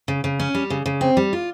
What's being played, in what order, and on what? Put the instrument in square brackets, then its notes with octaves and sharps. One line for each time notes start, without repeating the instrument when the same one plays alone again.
[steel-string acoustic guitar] C#3
C#3
C#4
G3
C#3
C#3
C4
G3
F4